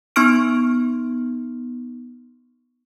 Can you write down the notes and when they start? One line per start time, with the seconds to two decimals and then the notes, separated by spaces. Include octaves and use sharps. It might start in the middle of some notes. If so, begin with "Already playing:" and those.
0.16 B3 D#4 C6 C#6 F6 D7